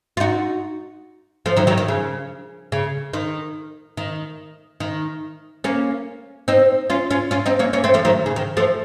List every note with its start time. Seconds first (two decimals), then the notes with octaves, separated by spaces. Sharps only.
0.17 F4
0.20 D#4 F#4
1.46 F3 A3
1.56 D#3 F#3
1.67 D#3 F#3
1.78 D#3
1.88 C#3
2.72 C#3
3.13 D#3
3.97 D#3
4.80 D#3
5.64 A#3 C#4
6.48 C4 D#4
6.90 C#4 F4
7.11 C#4 F4
7.31 C#4 F4
7.46 C4 D#4
7.59 A#3 C#4
7.73 A#3 C#4
7.84 A3 C4
7.94 F3 A3
8.05 D#3 F#3
8.26 C#3
8.36 D#3
8.57 F3 A3